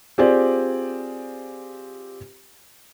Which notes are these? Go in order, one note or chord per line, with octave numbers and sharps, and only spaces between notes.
C4 F4 G4 G#4 C5 D5